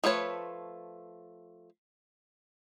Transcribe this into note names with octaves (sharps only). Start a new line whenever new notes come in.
F3 A3 B4 C#5